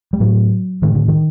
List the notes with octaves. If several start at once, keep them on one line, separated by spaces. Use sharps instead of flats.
G3
A2 F#3
A2 D#3
D3
D#3